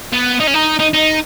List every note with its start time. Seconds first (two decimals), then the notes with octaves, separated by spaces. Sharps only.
0.12 B3
0.40 D#4
0.47 C#4
0.54 D#4
0.79 D#4
0.93 D#4